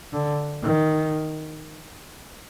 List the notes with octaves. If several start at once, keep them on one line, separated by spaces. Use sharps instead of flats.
D3
D#3